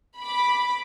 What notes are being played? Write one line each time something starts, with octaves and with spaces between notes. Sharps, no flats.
B5 D6